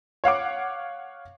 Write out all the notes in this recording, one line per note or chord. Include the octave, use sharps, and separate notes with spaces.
C#5 F5 F#5 D6